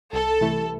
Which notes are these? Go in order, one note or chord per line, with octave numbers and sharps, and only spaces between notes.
C2 A4
C3 E3 A3 E4